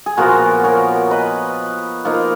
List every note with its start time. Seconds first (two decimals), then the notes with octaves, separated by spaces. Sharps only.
0.06 G#4
0.17 A#2 F3 B3 F4 F#4 A#4
0.64 A#4 C#5
1.11 B4 D#5
2.05 F3 A#3 D#4